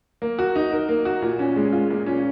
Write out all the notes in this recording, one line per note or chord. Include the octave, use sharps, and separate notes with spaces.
A#3
F#4
D#4
A#4
A#3
F#4
A#2
C#4
G#3
F4
A#2
C#4